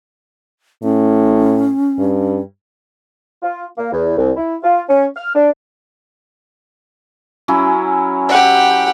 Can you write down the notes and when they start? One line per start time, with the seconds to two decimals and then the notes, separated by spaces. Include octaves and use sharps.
0.83 A2 C#4
1.98 G2
3.43 F4
3.77 A#3
3.92 E2
4.17 C2
4.37 E4
4.63 F4
4.88 C#4
5.16 F6
5.34 D4
7.48 F#3 C#4 E4
8.29 G4 F#5